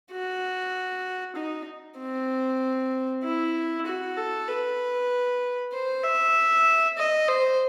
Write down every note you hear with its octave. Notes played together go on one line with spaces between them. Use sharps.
F#4
D#4
C4
E4
F#4
A4
B4
C5
E5
D#5
C5